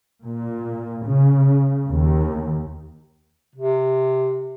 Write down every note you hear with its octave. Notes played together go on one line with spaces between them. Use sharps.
A#2
C#3
D#2
C3